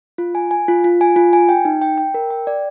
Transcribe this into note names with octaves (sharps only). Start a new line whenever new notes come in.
F4
G#5
G#5
F4
F4
G#5
F4
G#5
G5
D#4
G5
G5
A#4
G5
D5